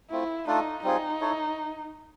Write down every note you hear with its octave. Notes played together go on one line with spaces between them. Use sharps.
A3 C4 E4 F4
A3 D4 D#4 F4 A4
G3 C4 D#4 F4 G#4
E4 A4 C#5